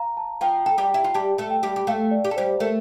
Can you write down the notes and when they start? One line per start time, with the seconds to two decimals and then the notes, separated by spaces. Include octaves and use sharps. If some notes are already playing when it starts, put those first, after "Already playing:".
Already playing: F5 A#5
0.17 A5
0.41 F3 F4 G5
0.66 A4 G5
0.78 G3 G4
0.91 E4 G5
1.04 F4
1.14 G3 G4 A5
1.38 A3 A4
1.50 G5
1.63 G3 G4
1.76 G4
1.87 A3 A4 F5
2.11 D5
2.24 G4
2.31 A4
2.37 G3 G4 C5
2.60 A3 A4 A#4